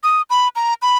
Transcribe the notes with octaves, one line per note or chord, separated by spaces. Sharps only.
D#6
B5
A#5
B5